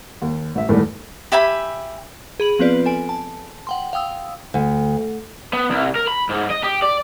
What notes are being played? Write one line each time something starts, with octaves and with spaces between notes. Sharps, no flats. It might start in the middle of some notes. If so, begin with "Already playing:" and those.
D#2
A1 E5
E2 A2 D#3 G3 A3
G4 E5 G#5 B5
G#4 B5 F#7
F3 B3 C4 F4 B4 D5
A4 G#5 D7
A5
F#5 G5 C6
F5 G5 D#6 E6
D2
B3
C2
A#4
B5
G#2
D#5
G4
D5